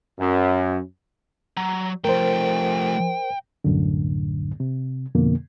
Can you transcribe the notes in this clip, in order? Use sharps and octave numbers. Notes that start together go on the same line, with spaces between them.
F#2
F#3 A#5
F3 A3 A#4 C5 G5
C2 F#2 A2 D3
C3
F2 B2 D3 A#3